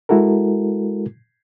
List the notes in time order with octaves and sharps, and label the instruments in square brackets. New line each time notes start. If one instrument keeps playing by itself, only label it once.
[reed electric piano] G#3 E4 F#4 A4 A#4